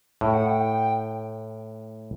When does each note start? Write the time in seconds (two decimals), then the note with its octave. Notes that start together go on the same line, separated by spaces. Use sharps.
0.21 A2 G5
0.33 F#5
0.46 G5